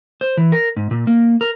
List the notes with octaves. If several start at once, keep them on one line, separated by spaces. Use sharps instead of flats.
C5
E3
A#4
G#2
A#2
A#3
A#4